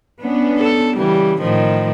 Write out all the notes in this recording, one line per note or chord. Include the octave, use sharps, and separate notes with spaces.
B3 C#4 D4
A4
C#3 E3 G3
A2 D#3 F3